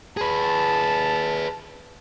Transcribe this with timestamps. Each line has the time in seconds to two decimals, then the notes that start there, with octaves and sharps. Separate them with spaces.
0.17 G#4 B4 A5